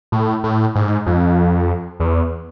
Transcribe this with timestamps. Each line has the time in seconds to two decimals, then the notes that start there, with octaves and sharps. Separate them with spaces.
0.12 A2
0.44 A2
0.75 G#2
1.06 F2
2.00 E2